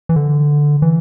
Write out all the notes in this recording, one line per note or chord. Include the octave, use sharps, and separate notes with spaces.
E3
D3
E3